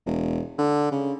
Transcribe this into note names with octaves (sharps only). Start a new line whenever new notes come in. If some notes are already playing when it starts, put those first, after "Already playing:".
E1
D3
C#3